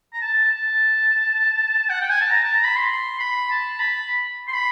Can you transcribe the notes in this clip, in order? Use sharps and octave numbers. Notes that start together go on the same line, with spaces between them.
A#5
A5
A5
F#5
G5
G#5
A5
A#5
A5
A#5
B5
C6
B5
A5
B5
C6
B5